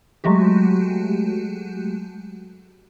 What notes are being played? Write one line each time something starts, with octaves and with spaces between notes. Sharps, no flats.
F#3 G#3 A3 F#4 G4